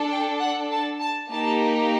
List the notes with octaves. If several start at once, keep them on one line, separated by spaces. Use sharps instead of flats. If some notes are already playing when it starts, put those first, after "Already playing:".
Already playing: D4 A4
G5
F#5
A5
A5
A#3 D#4 G4 A5